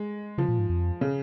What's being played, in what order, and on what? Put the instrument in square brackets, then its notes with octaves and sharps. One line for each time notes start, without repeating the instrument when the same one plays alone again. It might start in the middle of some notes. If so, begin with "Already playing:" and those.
Already playing: [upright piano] G#3
[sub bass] C#3 [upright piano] F3
[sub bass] A#2
G#2
F2
[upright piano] C#3